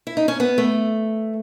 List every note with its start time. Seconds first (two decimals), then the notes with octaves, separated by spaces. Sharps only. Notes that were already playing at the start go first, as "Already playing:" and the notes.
0.07 E4
0.17 D#4
0.28 C#4
0.40 B3
0.58 A3